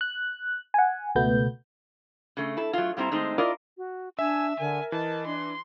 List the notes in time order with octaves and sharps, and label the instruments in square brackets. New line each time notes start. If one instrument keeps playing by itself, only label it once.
[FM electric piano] F#6
F#5 G#5
C#2 B2 A3 B3 G6
[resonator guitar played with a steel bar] C#3 A3
E4 A4
F#3 A3 F4
A#2 G3 C4 E4 A#5
D#3 G#3 A3 C4 D#4
E4 F4 A#4 D5 D#5
[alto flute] F#4
[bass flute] D4 [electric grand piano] E5 [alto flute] G#5 [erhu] E6
[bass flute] D3 [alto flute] A#4 [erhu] G#5
[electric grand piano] E3 [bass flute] D#5 [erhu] A5
[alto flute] D4 [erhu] C6